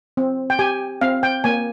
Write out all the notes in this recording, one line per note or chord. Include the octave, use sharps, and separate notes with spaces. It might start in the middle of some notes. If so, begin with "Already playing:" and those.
C4
G5
G4 G#5
C4 F5
G5
A#3 G#5